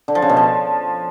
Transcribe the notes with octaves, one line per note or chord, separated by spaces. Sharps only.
D3
F3
C#3
B2
F3